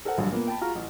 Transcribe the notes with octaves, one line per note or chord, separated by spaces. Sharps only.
A4 A#4 C5 F#5
A#1 G2 D3 F#3
A#2 A#3 B3
G5 A5 B5
F4 F#4 G#4 A#5 F6
A1